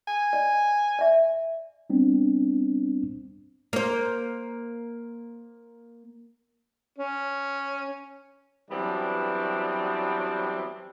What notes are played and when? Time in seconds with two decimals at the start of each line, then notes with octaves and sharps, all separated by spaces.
0.08 G#5
0.33 D5 D#5
0.99 D5 E5
1.90 G3 B3 C4 D4
3.73 A#3 C5
6.98 C#4
8.71 E3 F#3 G3 B3 C4 D4